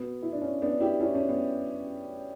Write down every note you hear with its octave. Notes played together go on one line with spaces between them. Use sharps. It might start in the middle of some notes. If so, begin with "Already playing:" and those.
Already playing: B2 B3
E4
D4
C#4
B3 D4
E4 G4
C#4 E4
C#4
B3